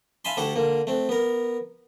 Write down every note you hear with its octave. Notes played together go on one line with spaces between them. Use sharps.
E5 F5 G#5 A5 B5 C6
D2 D4 G4 A4 F#5 C#6
D3 A#3
A3 C4
B3 A#4